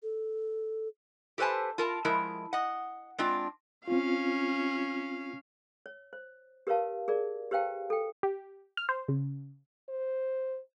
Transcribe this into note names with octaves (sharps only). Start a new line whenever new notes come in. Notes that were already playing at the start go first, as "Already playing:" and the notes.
A4
G4 A4 B4 C5 G#5 A5
F4 A#4 A5
F3 G#3 E4 A#4
D#5 F#5
G#3 C4 D4 F4
C4 C#4 F4 F5
C#5
C5
G4 A#4 B4 C#5 F5 A5
G#4 A#4 D5
G4 B4 C5 F5 G5 A5
A4 G5
G4
F6
C5
C#3
C5